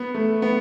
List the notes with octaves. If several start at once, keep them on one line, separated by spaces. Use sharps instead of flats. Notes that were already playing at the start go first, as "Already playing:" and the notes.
Already playing: B3
A3
B3